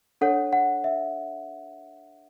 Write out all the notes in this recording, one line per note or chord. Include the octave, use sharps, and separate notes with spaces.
D4 A4 C#5 F#5
F#5
E5